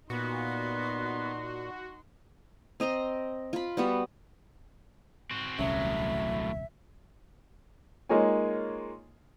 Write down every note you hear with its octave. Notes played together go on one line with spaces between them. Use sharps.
A#2 B3 D#4 F#4 C6
C4 D#5 A#5 C6
F4 B5
G3 B3 F#4
C4 F#4
D#1 C2 A2 F#3 C#4 E5
G#3 A#3 D#4 F4 C#5 G#5